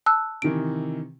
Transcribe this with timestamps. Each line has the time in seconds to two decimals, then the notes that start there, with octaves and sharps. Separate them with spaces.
0.06 A5 E6 F#6
0.42 C3 D#3 E3 D7